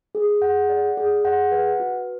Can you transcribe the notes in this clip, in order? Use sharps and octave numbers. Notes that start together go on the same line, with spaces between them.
G#4
F#5
D5
G#4
F#5
B4
F#4